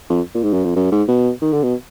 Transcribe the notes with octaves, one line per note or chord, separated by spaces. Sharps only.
F2
A#2
G#2
F#2
F2
F#2
G#2
B2
D#3
D3
B2